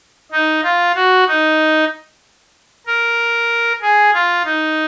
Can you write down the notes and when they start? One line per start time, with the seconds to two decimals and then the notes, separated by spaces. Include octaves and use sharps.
0.32 D#4
0.63 F4
0.96 F#4
1.27 D#4
2.87 A#4
3.82 G#4
4.14 F4
4.45 D#4